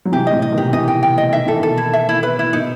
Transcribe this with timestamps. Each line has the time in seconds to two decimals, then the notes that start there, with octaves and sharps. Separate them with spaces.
0.05 F#3
0.12 C3 E3 G4
0.27 D#5
0.32 A2 C3
0.42 D#5
0.52 B2 D#3
0.58 G4
0.72 C3 E3 D#5
0.88 G5
1.03 G5
1.18 D#5
1.33 D#3 E5
1.47 E3 A4
1.59 B2 D#3 A4
1.78 E4
1.93 E5
2.09 E4
2.23 B4
2.39 E4
2.53 B2 D#3 D#4